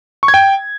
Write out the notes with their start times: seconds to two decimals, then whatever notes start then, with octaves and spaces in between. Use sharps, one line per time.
0.23 C#6
0.28 G#6
0.34 G5